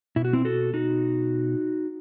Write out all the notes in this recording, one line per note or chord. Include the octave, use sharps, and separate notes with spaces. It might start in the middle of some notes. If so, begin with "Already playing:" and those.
B2 E4
F#4
C4 E4
F#4 A4
D#4 F#4